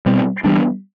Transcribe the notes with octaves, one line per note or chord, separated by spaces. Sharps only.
B2 G3 C4
E3 G3 B3 D4